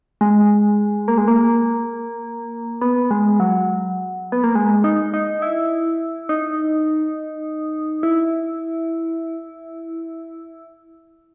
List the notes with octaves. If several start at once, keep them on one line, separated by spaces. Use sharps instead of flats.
G#3
A#3
G#3
A#3
B3
G#3
F#3
B3
A#3
G#3
D#4
D#4
E4
D#4
E4